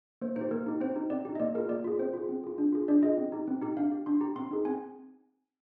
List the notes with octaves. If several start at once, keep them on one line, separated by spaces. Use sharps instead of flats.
A#3 C5
D#4 G4 C5
A#3 A#4
D#4 G4
C4 C5
D#4 G4
C4 D5
D#4 G4
D#5
A#3 D5
F4 G#4 A#4
A#3 D5
F4 G#4
C4 C5
F4 G#4
C4
F4 G#4
D4
F4 G#4
D4 D5
F4 G#4 D#5
C4
D#4 G4
C4
D#4 G4
D4 F5
G4
D4 C6
G4 A#5
C4 C6
D#4 G#4
C4 G#5